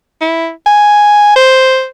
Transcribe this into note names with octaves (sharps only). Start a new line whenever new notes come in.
E4
G#5
C5